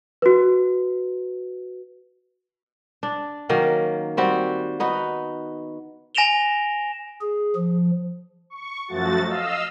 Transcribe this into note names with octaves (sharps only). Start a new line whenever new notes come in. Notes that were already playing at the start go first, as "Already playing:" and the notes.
F#4 B4
D4
D#3 F#3 A#3 C#4
G3 C4 F#4
B3 D#4 F#4
G#5 A#6 D7 E7 F7 G7
G#4
F3
C#6
F#2 F3 A3 F#4 A6
D#5 F5 E6